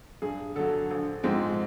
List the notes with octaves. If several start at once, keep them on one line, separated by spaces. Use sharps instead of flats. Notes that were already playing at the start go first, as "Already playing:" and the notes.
G2 G#4
D3 F#3 A4
A#1
G#2 F3 G#3 C4